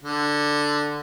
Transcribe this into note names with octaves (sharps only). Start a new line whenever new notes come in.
D3